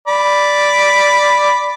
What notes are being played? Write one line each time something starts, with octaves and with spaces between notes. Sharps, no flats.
D5 B5